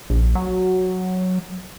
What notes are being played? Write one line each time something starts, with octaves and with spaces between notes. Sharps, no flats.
A#1
F#3